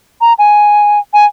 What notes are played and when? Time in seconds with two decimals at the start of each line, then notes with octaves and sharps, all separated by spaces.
0.21 A#5
0.39 G#5
1.14 G#5